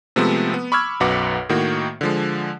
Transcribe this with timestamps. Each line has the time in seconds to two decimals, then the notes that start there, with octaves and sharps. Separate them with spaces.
0.16 C3 F3 G#3 A3 B3 C4
0.54 B3
0.72 B5 C#6 D6 E6 F6 G#6
1.00 B1 F#2 F#4 B4 F#5 D6
1.49 A2 D#3 A#3 F#4
2.01 D3 F3 G#3